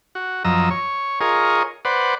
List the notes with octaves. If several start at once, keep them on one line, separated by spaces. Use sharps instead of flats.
F#4
F#2 F3 D#5 A#5 E6
C#5
F4 G#4 A#4 C#5 D#5
B4 C5 D5 F#5